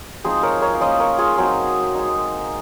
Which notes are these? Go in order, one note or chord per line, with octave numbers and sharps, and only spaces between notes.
F3 G#3 C4 D#4 G#4 C5
A#4 C#5
A#4 C#5
F5
A#3 C#4 F4 C5 D#5
A#4 C#5
F4 G#4
F#3 C4 D#4 G#4 C5
G#3 D#4